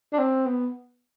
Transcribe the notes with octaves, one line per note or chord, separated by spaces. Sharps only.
D4
C4
B3